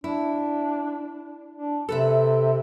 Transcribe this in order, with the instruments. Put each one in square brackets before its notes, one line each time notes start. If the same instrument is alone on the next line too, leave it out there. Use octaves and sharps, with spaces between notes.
[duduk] D4 [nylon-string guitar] E4
[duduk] D4
[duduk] C3 [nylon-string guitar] A4 B4 E5